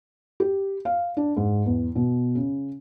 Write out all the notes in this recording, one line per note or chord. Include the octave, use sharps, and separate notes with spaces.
G4
F5
D4
G#2
E2
B2
C#3